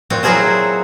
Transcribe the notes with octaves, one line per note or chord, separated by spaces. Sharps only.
A#2 C4 F#4
F#3 E4 F#4 G#4 A#4 C5